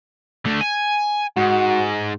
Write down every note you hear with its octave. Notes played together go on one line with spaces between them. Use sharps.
D3 A3
G#5
G#2 F#4